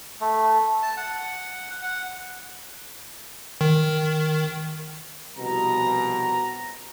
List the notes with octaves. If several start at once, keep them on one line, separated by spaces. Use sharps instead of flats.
A3
A5
F#5
F#5
D#3
C2 B2 F3 A#5